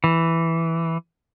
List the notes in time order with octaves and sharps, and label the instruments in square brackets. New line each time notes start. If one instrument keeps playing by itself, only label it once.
[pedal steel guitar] E3